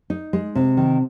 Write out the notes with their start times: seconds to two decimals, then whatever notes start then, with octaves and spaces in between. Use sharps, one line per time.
0.10 D#4
0.33 G#3
0.55 C3
0.77 D#3